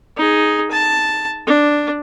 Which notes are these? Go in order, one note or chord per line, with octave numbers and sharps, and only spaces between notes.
D#4 G#4
A5
D4